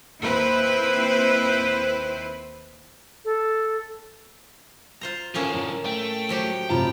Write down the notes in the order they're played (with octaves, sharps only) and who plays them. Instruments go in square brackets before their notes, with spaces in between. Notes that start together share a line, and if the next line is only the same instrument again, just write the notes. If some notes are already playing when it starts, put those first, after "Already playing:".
[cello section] D#2 C4 E4 B4 C5
[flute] A4
[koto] F4 C5 A#5
[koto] A2 A#3 C#4 [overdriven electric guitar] D3 F3
[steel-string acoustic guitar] A#4
[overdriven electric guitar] A3 [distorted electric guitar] G5
[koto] F3 F#3 G4
[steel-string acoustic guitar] A2 C3 F4 [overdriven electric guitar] A5 A#5